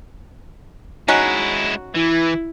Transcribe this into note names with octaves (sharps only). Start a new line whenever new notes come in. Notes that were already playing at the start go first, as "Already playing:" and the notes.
G#3 C#4 D#4 E4 F#4
E3 E4